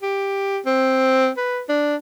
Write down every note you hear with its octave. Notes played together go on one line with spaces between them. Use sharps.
G4
C4
B4
D4